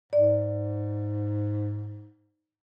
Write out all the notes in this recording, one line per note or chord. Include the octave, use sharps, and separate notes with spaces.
G#2 D5